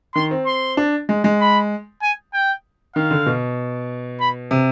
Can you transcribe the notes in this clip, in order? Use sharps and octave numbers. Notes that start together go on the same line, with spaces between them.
D#3 C6
C4
C6
D4
G#3
G#3
B5
G#5
G5
D#3 F5
D3
B2
B5
C3